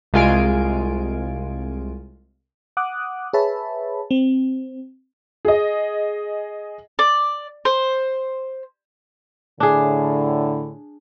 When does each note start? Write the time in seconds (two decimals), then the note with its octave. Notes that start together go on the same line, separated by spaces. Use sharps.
0.13 C2 G#3 F4 G#5 D7
2.77 F#5 D6 D#6 F#6
3.33 G#4 B4 C#5 E5 A5 B5
4.11 C4
5.45 G#4 D#5
6.99 D5
7.65 C5
9.60 A2 D3 D4 G#4